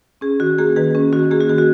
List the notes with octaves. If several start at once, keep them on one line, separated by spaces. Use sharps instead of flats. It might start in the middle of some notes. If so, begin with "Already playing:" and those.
C#4 G#4
D#3 F#4
A#3 G#4
D#3 G#4 B4
C#4 G#4
D#3 F#4
A#3 G#4
F#4
D#3 G#4
F#4